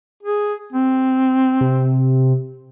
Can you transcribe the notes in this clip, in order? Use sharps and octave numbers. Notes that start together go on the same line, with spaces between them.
G#4
C4
C3